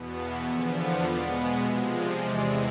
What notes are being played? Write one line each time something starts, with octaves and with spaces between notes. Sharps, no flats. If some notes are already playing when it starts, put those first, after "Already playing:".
Already playing: E2 B2 B3
F5 A5
E2 D3 F3 B3 E5 G#5
D5 F5
B2 G#3 B3 D5 F5
C3 F3 G#3 E5 G#5
D5 F5
E2 C3 E3 G#3 D5